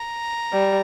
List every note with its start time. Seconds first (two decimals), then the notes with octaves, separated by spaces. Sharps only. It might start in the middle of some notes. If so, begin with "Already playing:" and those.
Already playing: A#5
0.52 G3